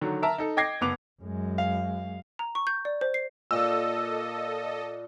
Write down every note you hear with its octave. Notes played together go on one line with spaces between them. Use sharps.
D3 D#3 F#3
A#4 E5 A5 A#5
D#4 A4
D#5 G5 D6 G#6 A#6 C7
F#1 B3 D6 F7
F#2 G#3
F5
A#5
C#6
G6
D5
C5
C7
A#2 A4 D#5 E6